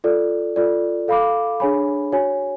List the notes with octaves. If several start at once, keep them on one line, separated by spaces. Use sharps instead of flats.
F4 A4 D5
F4 A4 D5
A4 F5 B5 D6
D4 G#4 C#5 G#5 B5
F#4 C#5 G#5